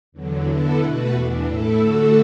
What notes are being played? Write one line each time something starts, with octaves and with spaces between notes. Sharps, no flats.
E2 D3 F#3
D3 B3 E4 A4
B2 A3 F#4 B4
E2 E3 D4
A2 A3 E4 A4
D3 A3 F#4 A4